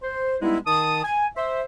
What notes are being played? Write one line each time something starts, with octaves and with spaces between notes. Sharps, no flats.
C5
G2 G3 G#3 B3 D#4 E4
D#3 A5 D#6
G#5
C5 E5